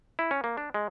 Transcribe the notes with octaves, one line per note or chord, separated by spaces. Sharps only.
E4
C#4
A#3
D4
G#3